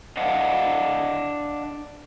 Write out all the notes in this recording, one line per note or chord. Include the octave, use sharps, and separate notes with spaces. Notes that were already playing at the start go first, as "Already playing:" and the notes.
D4 D#5 F5 F#5